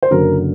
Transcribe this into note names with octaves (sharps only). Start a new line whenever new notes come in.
C5
F#1 F#2 D3 F#3 A#4